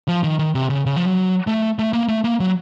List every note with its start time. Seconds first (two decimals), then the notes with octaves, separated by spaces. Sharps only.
0.08 F3
0.24 D#3
0.39 D#3
0.55 C3
0.70 C#3
0.86 C#3
0.97 F3
1.06 F#3
1.47 A3
1.79 A3
1.93 A#3
2.08 A3
2.24 A#3
2.40 F#3